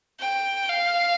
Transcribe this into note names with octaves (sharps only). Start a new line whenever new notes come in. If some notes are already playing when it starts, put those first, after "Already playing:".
G5
F5